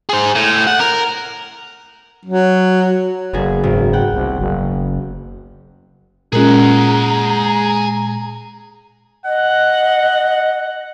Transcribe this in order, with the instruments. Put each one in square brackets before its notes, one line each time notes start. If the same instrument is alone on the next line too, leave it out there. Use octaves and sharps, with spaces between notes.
[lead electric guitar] G#4 C5
A2
F#5
A#4
[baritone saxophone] F#3
[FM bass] F#1 [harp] B3 F#4 G#4
[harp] G#1
F#5 G5
[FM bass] C2
F#1
[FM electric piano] A#2 G#3 [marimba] C#4 F4 A#4 [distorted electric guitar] G#4 F#5 [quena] A#5
[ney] D#5 [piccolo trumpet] F#5